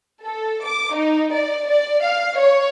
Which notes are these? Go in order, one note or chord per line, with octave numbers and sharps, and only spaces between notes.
A4
D6
D#4
D5
D5
F5
C#5